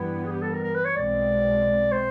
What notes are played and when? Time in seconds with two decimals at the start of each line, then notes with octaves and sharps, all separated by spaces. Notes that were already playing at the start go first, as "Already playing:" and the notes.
Already playing: G2 E3 G3 B3 E4
0.25 G#4
0.31 G4
0.42 A4
0.53 A#4
0.63 A#4
0.74 B4
0.85 C#5
0.96 B1 B2 G#3 C4 D5
1.92 C5